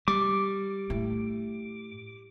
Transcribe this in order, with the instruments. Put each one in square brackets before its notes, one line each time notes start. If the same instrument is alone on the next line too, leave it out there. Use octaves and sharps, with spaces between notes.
[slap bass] G3 [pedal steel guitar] D6
[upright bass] A2